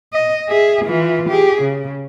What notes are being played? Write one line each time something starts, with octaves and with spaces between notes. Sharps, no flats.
D#5
G#4 E5
E3 F4
G4 G#4
C#3